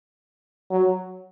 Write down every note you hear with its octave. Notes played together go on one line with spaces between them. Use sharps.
F#3